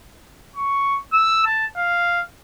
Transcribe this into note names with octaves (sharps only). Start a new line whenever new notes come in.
C#6
E6
A5
F5